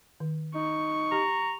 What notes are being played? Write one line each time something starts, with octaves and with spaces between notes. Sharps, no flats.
D#3
D#4 C#6
G4 A#5